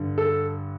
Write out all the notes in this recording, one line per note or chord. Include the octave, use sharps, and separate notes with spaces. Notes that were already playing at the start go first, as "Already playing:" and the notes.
Already playing: G2 D3
A4